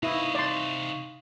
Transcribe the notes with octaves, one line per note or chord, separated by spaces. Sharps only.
C3 D#4 E4 D#5 F5 C#6
D5 C6